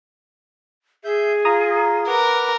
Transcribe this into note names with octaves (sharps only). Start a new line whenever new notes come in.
G#4 E5 G6
F4 A#5 D#6
A#4 B4 F#5 D6